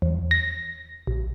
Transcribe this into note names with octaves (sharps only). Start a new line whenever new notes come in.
E2
A#6
A#1